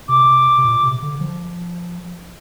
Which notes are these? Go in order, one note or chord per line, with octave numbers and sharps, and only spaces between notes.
C3 D6
C3
A#2
C3
D3
F3